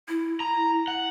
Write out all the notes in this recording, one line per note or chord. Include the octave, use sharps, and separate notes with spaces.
E4
A#5
F#5